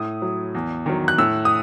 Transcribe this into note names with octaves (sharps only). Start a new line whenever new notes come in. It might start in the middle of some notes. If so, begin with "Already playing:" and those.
Already playing: A2 D#6
F#3
E2
D#3 F#3
F#6
A2 E6
D#6